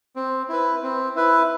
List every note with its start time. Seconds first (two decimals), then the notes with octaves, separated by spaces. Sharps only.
0.16 C4
0.49 E4 B4
0.83 C4
1.16 E4 B4